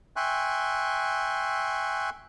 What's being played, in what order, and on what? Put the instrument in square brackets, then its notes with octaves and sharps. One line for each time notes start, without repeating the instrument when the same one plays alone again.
[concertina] E5 G5 G#5 C6 C#6 F#6